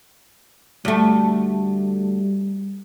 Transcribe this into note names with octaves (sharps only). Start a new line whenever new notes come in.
D2 G3 A3